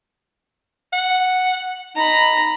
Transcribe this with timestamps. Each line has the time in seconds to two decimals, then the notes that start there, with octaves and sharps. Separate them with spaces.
0.93 F#5
1.96 D#4 A#5 B5